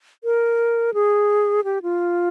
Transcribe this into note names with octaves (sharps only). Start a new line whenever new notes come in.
A#4
G#4
G4
F4